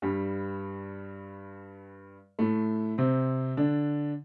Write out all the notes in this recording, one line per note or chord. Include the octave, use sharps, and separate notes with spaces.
G2 G3
A2 A3
C3 C4
D3 D4